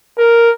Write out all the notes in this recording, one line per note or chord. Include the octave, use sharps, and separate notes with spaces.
A#4